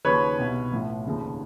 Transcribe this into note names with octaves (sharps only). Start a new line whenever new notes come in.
D#2 C#3 F3 B4 C#5
C2 B2
A1 A2 F3
F1 D#2 C#3 F3